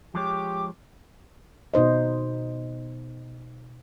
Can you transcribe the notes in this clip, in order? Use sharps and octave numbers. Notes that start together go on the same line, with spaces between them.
F3 G#3 G4 C#5 D6
B2 D#4 C5 D#5